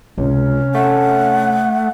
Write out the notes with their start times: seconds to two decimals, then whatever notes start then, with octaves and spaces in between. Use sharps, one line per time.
0.18 C#2 C3 C#4
0.74 A3 F#5